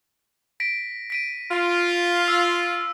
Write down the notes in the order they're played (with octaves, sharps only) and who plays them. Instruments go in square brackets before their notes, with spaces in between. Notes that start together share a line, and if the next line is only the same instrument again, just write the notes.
[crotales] A#6 B6 D7
B6 D7 D#7
[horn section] F4
[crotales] E6